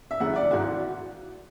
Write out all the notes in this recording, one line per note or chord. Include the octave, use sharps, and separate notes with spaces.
E5
F#1 E2 C#3 F#5
D5
G#1 G#2 E3 F#4